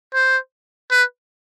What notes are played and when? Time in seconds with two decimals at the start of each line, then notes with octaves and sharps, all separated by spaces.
0.14 C5
0.91 B4